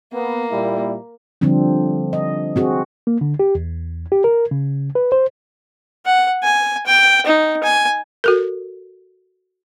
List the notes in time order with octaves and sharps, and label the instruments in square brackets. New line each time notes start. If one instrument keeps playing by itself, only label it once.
[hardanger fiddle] A#3 [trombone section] B3
[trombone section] A#2 G3 E4
[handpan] D3 F3 G3 C4 D4
D#5
C4 F#4 G#4
[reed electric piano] A#3
D3
G4
E2
G4
A#4
C#3
B4
C5
[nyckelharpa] F#5
G#5
G5
D#4
G#5
[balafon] F#4 A4 A#4